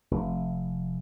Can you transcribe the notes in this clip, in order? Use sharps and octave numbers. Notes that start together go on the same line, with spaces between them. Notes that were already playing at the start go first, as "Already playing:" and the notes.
F1